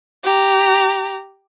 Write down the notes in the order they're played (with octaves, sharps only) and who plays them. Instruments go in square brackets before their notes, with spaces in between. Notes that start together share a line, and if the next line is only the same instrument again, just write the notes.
[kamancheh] G4 A#5